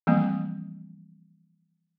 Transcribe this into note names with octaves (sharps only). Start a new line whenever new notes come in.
E3 F3 G3 A3 A#3 C4